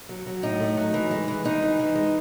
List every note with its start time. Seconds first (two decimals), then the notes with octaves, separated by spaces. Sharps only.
0.09 F#3
0.26 F#3
0.43 A2 D#4
0.60 A3
0.77 F#3
0.94 E3
1.11 G#3
1.28 E3
1.45 E3 D#4
1.62 E3
1.80 E3
1.95 G#3